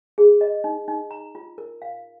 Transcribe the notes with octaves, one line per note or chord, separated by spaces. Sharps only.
G#4
D#5
D#4
D#4
A#5
F4
A#4
F5